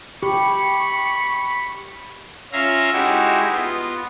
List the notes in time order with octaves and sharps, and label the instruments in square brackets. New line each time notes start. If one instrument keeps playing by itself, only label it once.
[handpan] G4 [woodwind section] B5 C#6
[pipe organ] C#4 F4 E5 F5 A#5
G#3 D#4 E4 F#4 G4
B3 F4